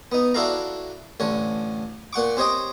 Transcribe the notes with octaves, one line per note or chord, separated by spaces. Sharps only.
B3 D#4
D4 E4 F#4 A4 F5 A#5
A1 D3 C#5
A#2 F#5 C#6 D6
C4 G4 C#5 D#5 G5